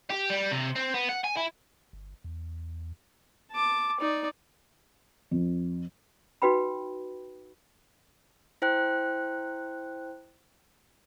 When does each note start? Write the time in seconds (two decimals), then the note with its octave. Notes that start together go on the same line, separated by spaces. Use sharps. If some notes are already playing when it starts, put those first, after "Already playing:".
0.10 G4
0.30 G3
0.51 C3
0.76 C4
0.94 B3
1.09 F#5
1.24 G#5
1.37 E4
1.93 G1
2.24 E2
3.52 A5 D6
4.00 D#4 D5
5.31 F2
6.42 D#4 F#4 B4 G5 B5
8.62 E4 C5 G5 F#6